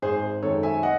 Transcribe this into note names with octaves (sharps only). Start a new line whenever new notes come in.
G#1 G#4 C5
F#2 D#3 G#3 C4 A4 C#5
E5 G#5
D#5 F#5